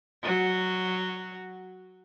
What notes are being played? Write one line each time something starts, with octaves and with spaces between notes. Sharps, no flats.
F#3 F#4